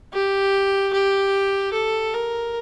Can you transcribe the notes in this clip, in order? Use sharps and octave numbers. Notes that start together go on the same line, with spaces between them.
G4
G4
A4
A#4